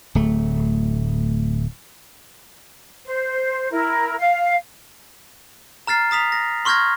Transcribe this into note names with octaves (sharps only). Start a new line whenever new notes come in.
D1 A3
C5
E4 A#4
F5
A#5 F6 A6 C7
A#5 D#6 B6 F7
A#6
C6 C#6 F6 G6 G#6 A#6